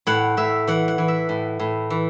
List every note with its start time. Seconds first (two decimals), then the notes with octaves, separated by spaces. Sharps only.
0.07 A2 F#5
0.37 A2 E5
0.67 E3 F#5
0.88 F#5
0.98 E3
1.08 E5
1.29 A2
1.59 A2
1.90 E3